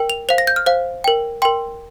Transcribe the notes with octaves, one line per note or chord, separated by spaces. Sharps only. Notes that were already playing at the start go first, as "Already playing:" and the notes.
Already playing: A#4 G5
F7
C5 F5 F7
A#6
G6
F6
C5 F5
A#4 G5
A#4 G5 C6